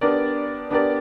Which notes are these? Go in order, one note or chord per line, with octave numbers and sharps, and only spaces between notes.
B3 D4 G4 A#4 D5
B3 D4 G4 A#4 D5